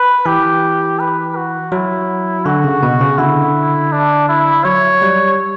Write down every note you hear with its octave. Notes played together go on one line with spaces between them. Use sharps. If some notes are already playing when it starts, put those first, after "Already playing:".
Already playing: B4
E3 G4
B4
F#4
F#3 E4
D3 F#4
C#3
B2
C#3
D3 E4
D4
E4
F#3 C#5
G3